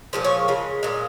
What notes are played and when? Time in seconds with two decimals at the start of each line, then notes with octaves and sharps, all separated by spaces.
0.13 A#2 F3 G#3 C5
0.24 C#5
0.48 C#3 G#3
0.83 A#2 G#3